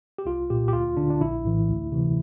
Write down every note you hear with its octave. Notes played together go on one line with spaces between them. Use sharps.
G4
C2 F4
A#2 G4
G4
D2 F4
D3 D4
D4
A#1 E4
A2 E3
D2
C3 E3